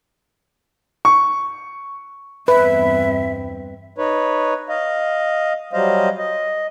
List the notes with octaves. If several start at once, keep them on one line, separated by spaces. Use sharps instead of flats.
C#6
E2 G2 C4 B4 E5
D#4 B4 C#5
D#5 F5
F#3 G3 C5 D#5 F5
D#5